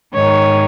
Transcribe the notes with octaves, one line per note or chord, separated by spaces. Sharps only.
G#2 D#3 C#5